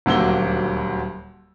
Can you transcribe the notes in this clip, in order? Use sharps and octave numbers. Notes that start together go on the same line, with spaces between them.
D#1 D2 F#3 A#3 E6 G7